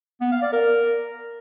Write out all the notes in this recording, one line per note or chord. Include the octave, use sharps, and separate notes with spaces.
B3
F5
D5
A#4